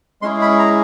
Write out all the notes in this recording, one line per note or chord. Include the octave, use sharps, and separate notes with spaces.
G#3 C#4 E4 G#4 C6
B5
A#5